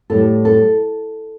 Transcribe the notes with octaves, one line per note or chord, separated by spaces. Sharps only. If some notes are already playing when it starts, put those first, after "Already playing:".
A2 G3 A4
A4